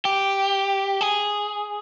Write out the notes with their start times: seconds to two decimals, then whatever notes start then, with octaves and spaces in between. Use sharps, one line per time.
0.05 G4
1.01 G#4